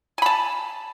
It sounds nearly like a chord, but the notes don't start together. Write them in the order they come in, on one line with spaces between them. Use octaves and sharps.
G#5 B5 A5